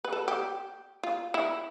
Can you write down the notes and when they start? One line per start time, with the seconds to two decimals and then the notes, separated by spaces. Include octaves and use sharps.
0.05 B4
0.13 A4
0.28 G4
1.03 F4
1.34 E4